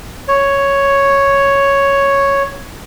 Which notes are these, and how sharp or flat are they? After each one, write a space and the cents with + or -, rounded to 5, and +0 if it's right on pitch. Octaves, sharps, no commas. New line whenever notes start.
C#5 +0